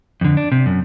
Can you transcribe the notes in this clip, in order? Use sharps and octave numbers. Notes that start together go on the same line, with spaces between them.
F2 D3
D4
C3
F#2